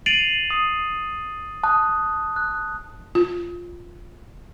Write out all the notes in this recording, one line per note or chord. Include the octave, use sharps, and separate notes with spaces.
A6 C7 D7 D#7 F7 F#7
D#6 C7
A5 D#6 F#6
F#6
F4